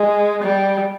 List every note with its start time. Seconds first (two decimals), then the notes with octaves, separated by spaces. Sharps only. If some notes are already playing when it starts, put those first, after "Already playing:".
Already playing: G#3
0.43 G3